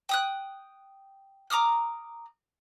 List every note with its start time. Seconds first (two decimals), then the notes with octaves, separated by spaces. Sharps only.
0.09 G5 D#6 F#6
1.50 A#5 D6 D#6 F6